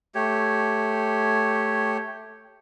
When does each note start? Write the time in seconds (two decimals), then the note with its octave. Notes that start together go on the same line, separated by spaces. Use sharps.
0.15 A3 G4 C#5